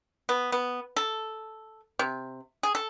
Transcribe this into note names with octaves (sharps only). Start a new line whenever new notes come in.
B3
B3
A4
C3
G#4
A4